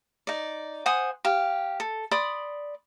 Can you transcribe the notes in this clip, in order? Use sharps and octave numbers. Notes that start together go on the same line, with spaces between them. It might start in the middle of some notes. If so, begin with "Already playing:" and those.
D#4 D5
C5 F#5 G#5 D#6
G4 F5
A4
D5 B5 C6 D#6